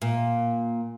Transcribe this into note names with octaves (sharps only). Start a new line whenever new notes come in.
A#2